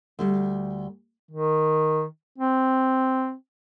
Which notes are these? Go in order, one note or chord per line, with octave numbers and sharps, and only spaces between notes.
D2 G3
D#3
C4